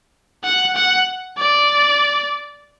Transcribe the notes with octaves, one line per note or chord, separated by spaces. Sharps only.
F#5
F#5
D5